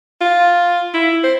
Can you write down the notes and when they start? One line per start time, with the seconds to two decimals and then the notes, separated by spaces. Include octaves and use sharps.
0.21 F4
0.94 E4
1.24 C5